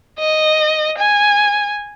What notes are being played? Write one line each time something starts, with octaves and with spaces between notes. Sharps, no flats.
D#5
G#5